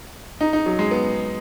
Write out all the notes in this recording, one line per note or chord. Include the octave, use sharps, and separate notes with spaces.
D#4
D#4
F#3
G#3
B3